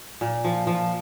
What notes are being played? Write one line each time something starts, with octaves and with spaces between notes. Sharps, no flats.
A#2
F3
F3